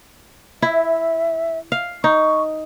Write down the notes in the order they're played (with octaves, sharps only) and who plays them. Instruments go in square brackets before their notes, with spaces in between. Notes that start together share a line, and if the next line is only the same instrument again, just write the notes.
[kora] E4 [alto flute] E5
[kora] F5
[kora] D#4 [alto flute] C#6